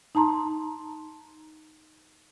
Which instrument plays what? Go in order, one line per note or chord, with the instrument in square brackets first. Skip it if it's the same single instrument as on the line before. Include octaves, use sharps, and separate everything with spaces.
[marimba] D#4 A5 A#5 C6